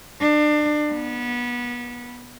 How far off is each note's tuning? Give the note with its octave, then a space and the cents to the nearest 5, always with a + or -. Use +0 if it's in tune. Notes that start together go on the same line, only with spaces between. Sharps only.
D4 +30
B3 -25